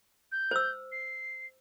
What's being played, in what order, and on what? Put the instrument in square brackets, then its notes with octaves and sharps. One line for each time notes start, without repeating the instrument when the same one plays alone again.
[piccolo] G6
[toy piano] C5 E6
[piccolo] C7